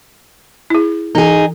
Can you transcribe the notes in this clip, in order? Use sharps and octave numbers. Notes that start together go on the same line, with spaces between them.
E4 G#4
E3 D#4 G#4